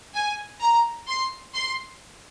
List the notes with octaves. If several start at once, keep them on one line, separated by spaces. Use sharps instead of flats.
G#5
A#5
C6
C6